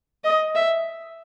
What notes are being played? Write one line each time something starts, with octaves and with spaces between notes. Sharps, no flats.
D#5
E5